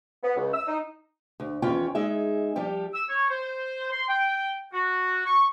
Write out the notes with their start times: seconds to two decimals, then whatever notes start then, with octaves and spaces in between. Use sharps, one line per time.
0.23 B3
0.36 C#2
0.53 E6
0.67 D#4
1.40 D2
1.62 E2 D#3 C#4 F4 C#5 G5
1.95 G#3 D#4 G#4 E5
2.56 F3 G3 G4
2.94 E6
3.09 C#5
3.30 C5
3.92 C6
4.08 G5
4.73 F#4
5.25 C#6